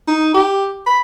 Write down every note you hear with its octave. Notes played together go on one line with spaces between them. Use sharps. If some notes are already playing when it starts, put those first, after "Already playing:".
D#4
G4
B5